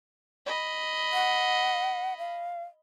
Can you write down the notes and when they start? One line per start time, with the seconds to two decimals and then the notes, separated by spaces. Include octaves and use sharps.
0.46 D#5 B5
1.13 F#5
2.18 F5